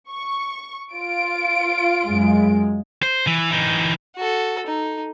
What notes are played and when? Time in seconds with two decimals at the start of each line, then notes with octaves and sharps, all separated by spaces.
0.10 C#6
0.93 F4 D7
2.05 F#2 G#3
3.02 C5
3.27 E3
3.52 E3 D#4
4.16 F#4 A4
4.67 D#4